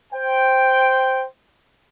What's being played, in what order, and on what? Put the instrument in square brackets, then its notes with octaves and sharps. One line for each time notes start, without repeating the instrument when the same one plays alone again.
[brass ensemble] C5 G5